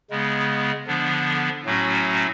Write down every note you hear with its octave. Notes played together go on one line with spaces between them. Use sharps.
C#3 G#3 B3
D3 F3 B3 D4
A2 F#3 A3 C#4 F#4